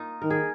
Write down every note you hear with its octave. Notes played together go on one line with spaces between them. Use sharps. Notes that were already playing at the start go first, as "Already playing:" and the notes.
Already playing: A#3 D#4 F4
D#3 A#4
G#4